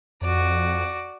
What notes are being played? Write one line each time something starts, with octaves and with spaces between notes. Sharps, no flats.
F2 F#4 D5